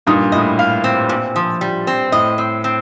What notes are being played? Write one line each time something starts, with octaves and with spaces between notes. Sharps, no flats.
G2 A#2 D#4
A2 D#5
F5
C4
A#2
F3
G3
C4
A2 D#5
C4
C4